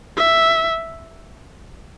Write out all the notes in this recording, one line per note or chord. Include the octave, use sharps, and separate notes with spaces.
E5